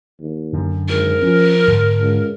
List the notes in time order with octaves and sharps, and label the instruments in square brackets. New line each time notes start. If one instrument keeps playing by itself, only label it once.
[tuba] D#2
[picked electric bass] F#2 D3
[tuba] G#1 [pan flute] A#4
[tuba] F3 [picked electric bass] C#4
[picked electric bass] G#2 D3
[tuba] C#2